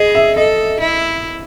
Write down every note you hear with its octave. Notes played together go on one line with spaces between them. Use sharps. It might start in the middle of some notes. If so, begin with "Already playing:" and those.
Already playing: G#4 D#5
E5
A4 D#5
E4